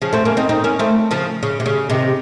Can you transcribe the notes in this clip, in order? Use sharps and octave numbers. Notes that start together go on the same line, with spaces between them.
C#3 F3
A3 C4
A#3 C#4
C4 D#4
C4 D#4
A#3 C#4
A3 C4
C#3 F3
C#3
C3
C#3
C3 D#3